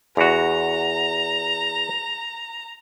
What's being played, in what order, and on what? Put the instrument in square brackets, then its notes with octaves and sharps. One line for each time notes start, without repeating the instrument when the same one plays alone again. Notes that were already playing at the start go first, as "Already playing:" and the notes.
[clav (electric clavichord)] E2 F#4 [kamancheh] A#5